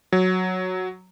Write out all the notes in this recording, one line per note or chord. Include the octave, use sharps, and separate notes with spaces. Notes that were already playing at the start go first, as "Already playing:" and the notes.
F#3